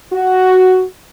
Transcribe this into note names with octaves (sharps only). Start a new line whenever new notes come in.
F#4